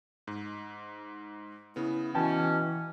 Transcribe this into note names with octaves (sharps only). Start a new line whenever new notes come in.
G#2
C#3 B3 E4
B2 E3 C#4 G5 A5